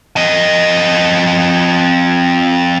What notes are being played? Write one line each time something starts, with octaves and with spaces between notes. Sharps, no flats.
F2 D#5